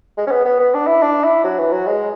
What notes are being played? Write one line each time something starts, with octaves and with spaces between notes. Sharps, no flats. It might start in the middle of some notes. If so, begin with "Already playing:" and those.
G#3
C#4
B3
B3
B3
D4
E4
D4
E4
F#3
E3
F#3
G#3